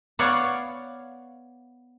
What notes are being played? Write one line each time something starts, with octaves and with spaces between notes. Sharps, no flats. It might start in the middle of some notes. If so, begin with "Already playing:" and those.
B3 C#5 D5 F5 F#5